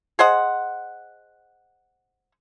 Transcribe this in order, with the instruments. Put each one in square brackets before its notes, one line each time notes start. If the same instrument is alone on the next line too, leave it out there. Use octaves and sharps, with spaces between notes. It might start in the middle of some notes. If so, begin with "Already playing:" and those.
[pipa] G#4 C5 D#5 F#5